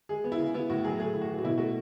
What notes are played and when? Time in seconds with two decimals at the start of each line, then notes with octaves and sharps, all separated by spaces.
0.09 G#3 G#4
0.24 B3
0.32 E4
0.39 C#3
0.54 B3 E4
0.70 A2 F#4
0.84 F#3 G#4
0.99 A3 G#4
1.14 A2
1.21 F#4
1.29 E3
1.39 F#4
1.44 B2 E4
1.58 A3 F#4